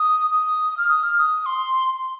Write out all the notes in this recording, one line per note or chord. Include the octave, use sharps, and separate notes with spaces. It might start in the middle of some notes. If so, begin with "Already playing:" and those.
Already playing: D#6
D#6
F6
D#6
F6
D#6
C6